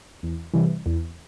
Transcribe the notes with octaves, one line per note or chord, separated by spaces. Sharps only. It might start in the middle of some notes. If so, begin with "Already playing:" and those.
E2
C3 E3 G3
E2